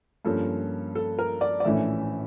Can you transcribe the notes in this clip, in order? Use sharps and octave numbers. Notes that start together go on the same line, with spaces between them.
G2 F3 A#3 C#4 A4
A4
A#4
D5
D5
A#1 A2 E3 A3 C#4 E5